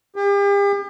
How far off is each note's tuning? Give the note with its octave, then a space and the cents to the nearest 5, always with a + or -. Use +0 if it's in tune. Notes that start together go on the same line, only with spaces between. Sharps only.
G4 +40